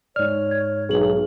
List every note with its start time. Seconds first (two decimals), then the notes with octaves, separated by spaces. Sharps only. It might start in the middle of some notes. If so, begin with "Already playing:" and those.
0.16 G#2 C#5 D5 F6
0.51 G#6
0.89 B1 G#4 F#7